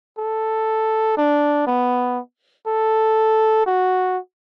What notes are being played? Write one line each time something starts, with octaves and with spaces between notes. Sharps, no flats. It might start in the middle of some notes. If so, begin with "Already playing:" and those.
A4
D4
B3
A4
F#4